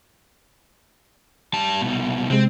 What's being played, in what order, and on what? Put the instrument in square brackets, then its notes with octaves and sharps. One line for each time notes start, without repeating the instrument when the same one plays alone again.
[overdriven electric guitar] G3 A5
C2 B2
[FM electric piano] C3 G#3 [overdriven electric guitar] C4